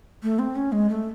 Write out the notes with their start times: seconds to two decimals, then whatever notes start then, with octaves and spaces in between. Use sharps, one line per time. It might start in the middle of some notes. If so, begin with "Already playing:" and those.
0.23 A3
0.39 C4
0.56 C#4
0.72 G#3
0.90 A3